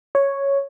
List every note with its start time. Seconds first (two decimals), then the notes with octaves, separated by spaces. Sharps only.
0.15 C#5